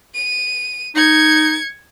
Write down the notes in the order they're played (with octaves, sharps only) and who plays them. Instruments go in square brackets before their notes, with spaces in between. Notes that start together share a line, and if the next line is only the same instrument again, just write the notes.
[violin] D#7
[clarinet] D#4 [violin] G#6 C#7